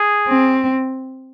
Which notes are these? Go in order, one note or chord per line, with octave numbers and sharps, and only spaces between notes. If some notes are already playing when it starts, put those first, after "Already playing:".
Already playing: G#4
C4